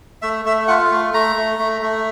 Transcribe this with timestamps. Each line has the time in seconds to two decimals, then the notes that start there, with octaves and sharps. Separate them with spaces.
0.22 A3 E5
0.45 A3 E5
0.68 F4 F#5
0.91 A3
1.14 A3 A#5
1.36 A3
1.59 A3
1.82 A3